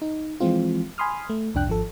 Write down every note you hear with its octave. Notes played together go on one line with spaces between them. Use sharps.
D#4
E3 F3 G#3 C4 F4
G#5 B5 C6 D#6 F6
A3
C2 F2 D4 G5 F#6
G#1 F3 A4